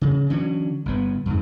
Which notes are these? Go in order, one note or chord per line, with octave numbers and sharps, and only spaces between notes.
C#3
D3 E3 F#3 C#4
G1 A2 B3
F2 G#2